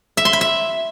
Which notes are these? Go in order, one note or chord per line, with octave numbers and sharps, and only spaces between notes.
E5
C6
B5
E5